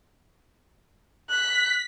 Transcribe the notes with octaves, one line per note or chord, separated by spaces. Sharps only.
F#6 B6